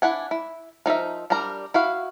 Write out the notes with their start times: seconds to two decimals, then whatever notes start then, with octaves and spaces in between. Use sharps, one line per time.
0.02 D4 E4 F#5 G#5
0.31 E4
0.86 F3 D#4 A#4 E5
1.30 G3 D4 A#4 A#5
1.74 E4 F#4 F5